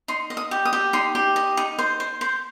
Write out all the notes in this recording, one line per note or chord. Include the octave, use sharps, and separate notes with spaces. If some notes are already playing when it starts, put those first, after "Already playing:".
D#4 C6
D#5
D#6
G4
D#6
G4
D#4 C6
G4
D#5
D#4
C5
C5
C5